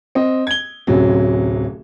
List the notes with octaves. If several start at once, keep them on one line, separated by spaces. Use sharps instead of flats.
C4 D#5
G#6 G7
D1 A1 C3 F#3